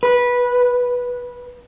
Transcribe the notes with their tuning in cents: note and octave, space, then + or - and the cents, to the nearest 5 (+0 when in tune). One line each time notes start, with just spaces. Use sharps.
B4 -15